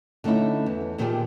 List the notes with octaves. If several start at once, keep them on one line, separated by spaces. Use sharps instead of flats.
D3 A3 C#4 D#4 E4
E2
A#2 D#3 F3 C4 G4 G#4